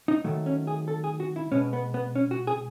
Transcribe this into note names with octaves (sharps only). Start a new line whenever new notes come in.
D#4
D#3 F#3 A3
C#4
G#4
A4
G#4
F#4
E4
B2 G#3 B3 C#4
B3
B3
C#4
F#4
G#4